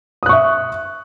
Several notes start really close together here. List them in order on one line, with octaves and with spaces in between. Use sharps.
D#6 F#6 C#6 E5